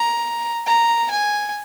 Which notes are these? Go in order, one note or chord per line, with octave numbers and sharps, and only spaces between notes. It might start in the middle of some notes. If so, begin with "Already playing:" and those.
Already playing: A#5
A#5
G#5